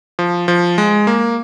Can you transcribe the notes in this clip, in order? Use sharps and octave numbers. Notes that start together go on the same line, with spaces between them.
F3
F3
G#3
A#3